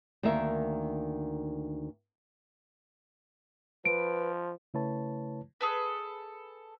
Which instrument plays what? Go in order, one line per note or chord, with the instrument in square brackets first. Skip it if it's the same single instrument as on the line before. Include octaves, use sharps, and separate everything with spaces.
[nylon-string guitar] D2 D#3 A#3 A#4 E5
[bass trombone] F3 [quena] B4 [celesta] D7
[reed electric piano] C#3 A3 E4 B4 C#5 A5
[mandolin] G#4 A4 B4